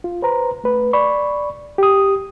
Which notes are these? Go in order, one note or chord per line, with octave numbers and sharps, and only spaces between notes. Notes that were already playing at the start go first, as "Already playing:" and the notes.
F4
B4 C5 A#5
A3 B4
D5 B5 C#6
G4 D#6